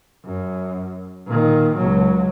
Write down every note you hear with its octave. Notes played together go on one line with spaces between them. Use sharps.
F#2
A#2 D#3
C#2 F#3